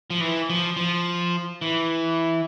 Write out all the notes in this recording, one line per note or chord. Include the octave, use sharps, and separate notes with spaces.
F3
E3
F3
F3
E3